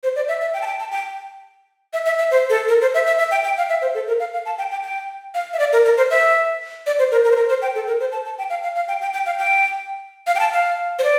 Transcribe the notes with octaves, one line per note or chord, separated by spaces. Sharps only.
C5
D5
E5
E5
G5
A5
G5
A5
G5
E5
E5
E5
C5
A4
A#4
C5
E5
E5
E5
G5
G5
F5
E5
C5
A4
A#4
F5
F5
A5
G5
G5
G5
F5
E5
D5
A#4
A#4
C5
E5
D5
C5
A#4
A#4
C5
A#4
C5
G5
A4
A#4
C5
A5
A5
G5
F5
F5
F5
G5
G5
G5
F5
G5
F5
G5
A5
F5
C5
D5